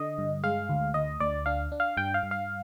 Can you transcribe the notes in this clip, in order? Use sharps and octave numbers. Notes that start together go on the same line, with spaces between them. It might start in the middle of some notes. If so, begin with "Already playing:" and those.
Already playing: D3 D#5
G2
G#3 F5
D2
D2 D#5
D2 D5
D4 F5
D4
F5
G2 G5
F5
G2
F5